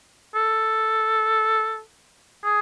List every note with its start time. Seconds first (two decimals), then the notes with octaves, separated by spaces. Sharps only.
0.35 A4
2.44 G#4